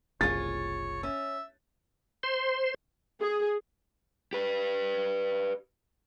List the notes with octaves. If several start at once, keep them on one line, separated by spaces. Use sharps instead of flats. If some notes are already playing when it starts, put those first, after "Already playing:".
F#1 C2 F4 G#4 C#5 A6
C#4 E5
C5 C6
G#4
G4 B4